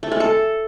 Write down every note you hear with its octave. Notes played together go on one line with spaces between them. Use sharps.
A3
G#3
A4